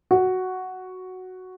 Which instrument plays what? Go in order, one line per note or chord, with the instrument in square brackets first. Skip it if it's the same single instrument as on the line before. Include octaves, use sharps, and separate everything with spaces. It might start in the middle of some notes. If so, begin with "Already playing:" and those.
[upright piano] F#4